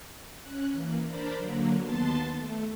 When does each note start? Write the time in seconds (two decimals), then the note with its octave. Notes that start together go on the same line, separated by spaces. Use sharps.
0.41 C#4 F#6
0.71 E3 A#3
1.04 D4 A#4 C5 D5 B5
1.35 D3 F#3 A#3
1.81 D#2 B3 A5 C6 A6
2.35 A3